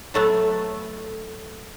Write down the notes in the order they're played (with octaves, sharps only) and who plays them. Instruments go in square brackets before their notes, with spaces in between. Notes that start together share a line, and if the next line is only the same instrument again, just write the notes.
[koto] F#3 A3 B3